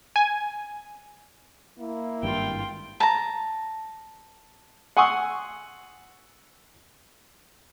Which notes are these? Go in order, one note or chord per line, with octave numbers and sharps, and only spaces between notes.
G#5
A#3 E4
G#1 G2 F4 G5
A5 A#5
F#5 G#5 C6 C#6 D#6 E6